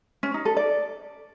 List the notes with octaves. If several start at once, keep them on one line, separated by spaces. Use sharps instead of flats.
C#4
D#4
A4
D5